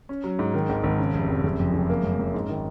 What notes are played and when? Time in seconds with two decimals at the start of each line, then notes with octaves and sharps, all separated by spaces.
0.09 C#4
0.24 F#3
0.39 G#2
0.54 D#3
0.69 G#1
0.84 G#1
0.99 C#3
1.14 F1
1.29 F1
1.44 F#1
1.60 F2
1.74 F#1
1.89 A#3
2.04 F#2
2.19 F#2
2.34 G#2
2.49 D#3